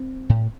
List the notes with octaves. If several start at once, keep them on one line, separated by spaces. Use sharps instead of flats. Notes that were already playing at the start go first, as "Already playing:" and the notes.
Already playing: C4
A2